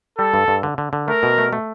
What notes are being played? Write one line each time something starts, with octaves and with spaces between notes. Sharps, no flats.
G3 A4
G2
G2
D3
D3
D3
A3 A#4
B2
A3
A3